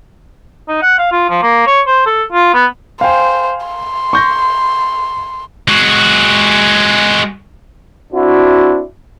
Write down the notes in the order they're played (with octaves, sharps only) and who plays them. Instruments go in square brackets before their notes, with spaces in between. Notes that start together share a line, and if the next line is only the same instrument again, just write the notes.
[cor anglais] D#4
F#5
F5
F4
F3
A#3
C#5
C5
A4
F4
B3
[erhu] C5 [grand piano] F5 G5 G#5
[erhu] C6
[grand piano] C#6 G6 A#6
[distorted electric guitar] G#3 F#4
[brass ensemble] C4 D4 E4 F#4